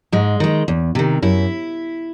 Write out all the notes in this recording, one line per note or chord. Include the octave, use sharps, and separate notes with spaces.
G#2 G#3
D#3 G#3
E2
C3 D#3
F#2 E4